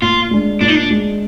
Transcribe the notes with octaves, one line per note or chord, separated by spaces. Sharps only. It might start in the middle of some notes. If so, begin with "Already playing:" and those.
A#2 F4
G#3 D4
A#2 D4
D#4
D4
G#3 D4